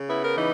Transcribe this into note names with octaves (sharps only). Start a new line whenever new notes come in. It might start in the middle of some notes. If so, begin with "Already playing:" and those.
Already playing: C#3
B3 E4
A#4
E3 D#4